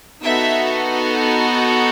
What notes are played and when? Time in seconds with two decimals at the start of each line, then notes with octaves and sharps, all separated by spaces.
0.23 B3 D#4 F#4 A4 E5